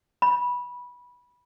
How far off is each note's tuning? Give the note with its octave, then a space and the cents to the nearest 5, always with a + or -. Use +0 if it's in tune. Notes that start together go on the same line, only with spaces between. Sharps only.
B5 -15